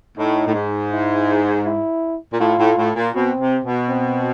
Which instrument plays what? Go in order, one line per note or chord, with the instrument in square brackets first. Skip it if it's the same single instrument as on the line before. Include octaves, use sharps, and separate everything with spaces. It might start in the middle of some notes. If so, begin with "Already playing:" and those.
[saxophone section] A2 [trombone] D#4
[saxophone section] A2
G#2
[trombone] E4
E4
[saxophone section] A#2
[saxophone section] A2 [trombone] F4
[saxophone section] A2
A2
A#2
[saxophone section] B2 [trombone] C4
[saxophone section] C3
B2
[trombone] C4